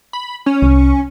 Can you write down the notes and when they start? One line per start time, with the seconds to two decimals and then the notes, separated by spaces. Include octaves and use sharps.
0.13 B5
0.46 C#4
0.62 C2